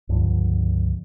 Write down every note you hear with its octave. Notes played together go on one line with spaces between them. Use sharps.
C#2 G2 D3 F3